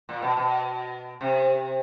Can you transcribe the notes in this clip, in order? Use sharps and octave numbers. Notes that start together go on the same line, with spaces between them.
A#2
B2
B2
C3